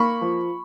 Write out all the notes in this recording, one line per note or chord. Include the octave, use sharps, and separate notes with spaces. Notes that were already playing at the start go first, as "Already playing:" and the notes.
Already playing: A#3 B5 C#6
F3